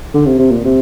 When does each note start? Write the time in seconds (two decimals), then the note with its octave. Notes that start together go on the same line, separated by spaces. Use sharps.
0.14 D3
0.26 C3
0.39 C3
0.51 A#2
0.65 C3